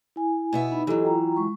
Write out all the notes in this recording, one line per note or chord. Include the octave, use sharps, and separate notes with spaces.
E4 G#5
B2 B3 E5
D#4 B5
E3 F#3 G4 A4 D#5
F4 G5 A#5
G#3 C#6